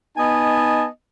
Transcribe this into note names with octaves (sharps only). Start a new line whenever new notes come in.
B3 D#4 D#5 G#5 A5